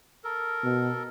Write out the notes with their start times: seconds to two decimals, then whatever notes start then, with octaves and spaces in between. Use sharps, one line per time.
0.24 A4 A#4
0.63 B2